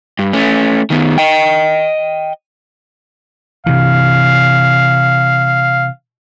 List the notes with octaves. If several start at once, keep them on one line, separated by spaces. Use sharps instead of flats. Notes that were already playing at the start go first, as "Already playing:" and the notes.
G2
A3 C#4
D#3 B3
D#5 G5
C3 E3 F5